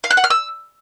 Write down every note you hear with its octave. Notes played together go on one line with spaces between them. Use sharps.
F5
F#6
F#5
F6
E6